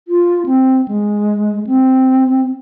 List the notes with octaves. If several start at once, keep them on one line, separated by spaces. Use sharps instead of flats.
F4
C4
G#3
C4